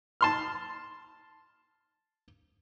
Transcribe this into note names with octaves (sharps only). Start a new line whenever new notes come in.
A5 C6 F6